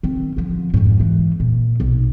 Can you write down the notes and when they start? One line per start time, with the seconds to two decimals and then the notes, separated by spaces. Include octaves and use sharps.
0.03 D#3 C4
0.37 D3 F3
0.74 F2 G#2
1.00 E3
1.40 A#2
1.80 B1